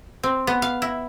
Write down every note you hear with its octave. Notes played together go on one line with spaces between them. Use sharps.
C4
B3
F5
E4